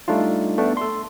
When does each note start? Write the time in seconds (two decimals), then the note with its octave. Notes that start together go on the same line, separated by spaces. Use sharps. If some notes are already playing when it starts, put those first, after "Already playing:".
0.08 G3 A3 D4 D#4 F4
0.58 A3 B3 D4
0.77 A4 C6